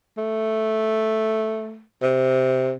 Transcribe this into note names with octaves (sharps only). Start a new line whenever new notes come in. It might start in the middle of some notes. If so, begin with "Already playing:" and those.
A3
C3